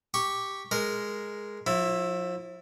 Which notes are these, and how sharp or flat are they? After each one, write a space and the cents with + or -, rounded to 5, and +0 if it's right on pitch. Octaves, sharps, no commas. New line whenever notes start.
G4 +0 C#6 +0
G#3 +0 A#4 +0
F3 +40 E4 +0